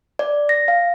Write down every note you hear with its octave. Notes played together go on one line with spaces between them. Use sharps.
D5
A#6
F5